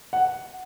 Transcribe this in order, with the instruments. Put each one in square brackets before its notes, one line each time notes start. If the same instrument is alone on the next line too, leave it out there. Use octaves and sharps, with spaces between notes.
[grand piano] F#5